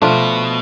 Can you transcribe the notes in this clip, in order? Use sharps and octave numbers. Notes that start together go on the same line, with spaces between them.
B2 F3 A3 D4 F4